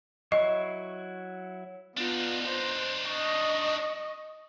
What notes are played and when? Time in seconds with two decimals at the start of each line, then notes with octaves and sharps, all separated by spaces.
0.32 F#3 E4 D#5 C#6
1.97 B3 D4 D#4 F4
2.48 C5
3.10 D#5 C#6